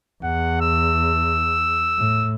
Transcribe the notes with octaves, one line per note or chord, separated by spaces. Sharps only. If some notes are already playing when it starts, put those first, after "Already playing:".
E2 F#5
E6
A2